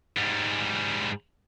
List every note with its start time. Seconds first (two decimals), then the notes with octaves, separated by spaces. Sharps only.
0.17 G#2 G3